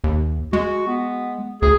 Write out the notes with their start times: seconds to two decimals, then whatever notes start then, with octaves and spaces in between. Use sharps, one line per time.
0.04 D#2
0.53 G#3 F#4
0.87 B3
1.62 D2 G#4